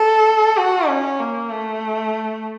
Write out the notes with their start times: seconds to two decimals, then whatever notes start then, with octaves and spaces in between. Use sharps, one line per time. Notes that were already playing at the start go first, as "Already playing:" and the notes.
Already playing: A4
0.57 F#4
0.88 C#4
1.20 A#3
1.50 A3